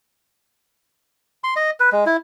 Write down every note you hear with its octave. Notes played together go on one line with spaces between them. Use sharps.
C6
D#5
B4
G#3
E4